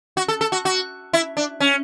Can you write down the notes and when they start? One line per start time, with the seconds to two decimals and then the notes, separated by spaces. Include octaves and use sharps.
0.17 F#4
0.28 A4
0.41 A4
0.52 F#4
0.65 F#4
1.13 E4
1.37 D4
1.60 C#4